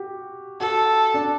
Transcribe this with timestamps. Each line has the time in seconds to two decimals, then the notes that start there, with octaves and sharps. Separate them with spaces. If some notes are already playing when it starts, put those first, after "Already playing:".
Already playing: F#4 G4
0.60 F#4 A4
1.14 D4